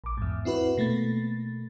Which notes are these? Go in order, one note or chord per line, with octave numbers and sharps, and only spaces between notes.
A#1 D6
E2 G#2
C4 E4 F#4 B4
B2 A3 A#3 A6